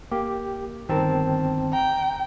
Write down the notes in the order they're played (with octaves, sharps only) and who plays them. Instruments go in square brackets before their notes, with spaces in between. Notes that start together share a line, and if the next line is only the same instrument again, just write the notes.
[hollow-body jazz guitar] A#3 [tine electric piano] G4
[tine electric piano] G1 C4 A5 [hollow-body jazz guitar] D#3 A#4
[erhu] G5 [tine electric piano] A#5